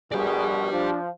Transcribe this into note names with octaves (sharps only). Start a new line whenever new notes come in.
A#1 B2 G4 G#4 D5
F3 D4